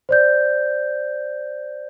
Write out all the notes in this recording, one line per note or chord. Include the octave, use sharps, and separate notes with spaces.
C5 D5 G6